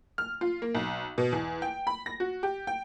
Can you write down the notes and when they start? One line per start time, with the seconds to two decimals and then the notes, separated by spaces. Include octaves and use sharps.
0.18 F6
0.41 F4
0.62 A#3
0.75 B1
1.18 B2
1.32 E2
1.62 G5
1.87 B5
2.06 A#6
2.20 F#4
2.43 G4
2.67 G5